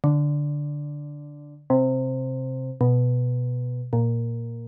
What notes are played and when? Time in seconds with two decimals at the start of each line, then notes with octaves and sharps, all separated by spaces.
0.04 D3
1.70 C3
2.81 B2
3.93 A#2